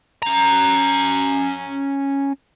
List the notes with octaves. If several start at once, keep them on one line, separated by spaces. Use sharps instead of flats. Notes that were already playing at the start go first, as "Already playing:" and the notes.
C#4 A#5